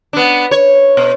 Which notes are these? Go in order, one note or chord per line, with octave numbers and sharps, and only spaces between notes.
B3 D4
C#5
B2